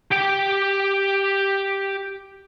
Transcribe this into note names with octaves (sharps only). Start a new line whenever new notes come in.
G4 G5